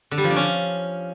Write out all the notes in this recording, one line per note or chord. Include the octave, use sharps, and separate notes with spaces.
D3
G3
F3
D4
C#4